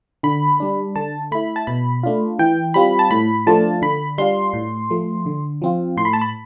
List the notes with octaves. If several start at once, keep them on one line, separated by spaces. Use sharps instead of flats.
D3 B5
G3 D4
D3 A5
A3 E4 B5
A5
B2 B5
A3 D4 F4
E3 G5
G3 C4 F4 B5
A5
A2 B5
F3 A3 D4 F4 A5
D3 B5
G3 D4 F4 C6
A2
F3 A3
D3
F3 C4 F4
A2 C6
B5
A5
B5